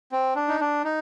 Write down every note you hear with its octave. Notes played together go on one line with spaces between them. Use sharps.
C4
D4
D#4
D4
D#4